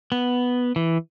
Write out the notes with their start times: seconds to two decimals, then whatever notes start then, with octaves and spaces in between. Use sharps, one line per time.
0.12 B3
0.76 E3